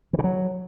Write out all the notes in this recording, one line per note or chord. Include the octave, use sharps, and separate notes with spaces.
E3
C#3
F#3